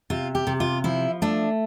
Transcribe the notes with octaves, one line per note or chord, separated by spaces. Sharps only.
C3 F4
G4
C3
F4
F3 E4
A3 D4